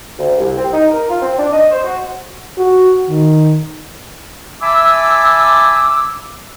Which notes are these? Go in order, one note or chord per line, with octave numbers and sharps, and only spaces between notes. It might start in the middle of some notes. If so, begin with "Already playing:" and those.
D2
C2
C4
D#4
A#4
F4
C4
D4
D#5
C5
F#4
F#4
D#3
E5 G#5 A5 B5 D6 E6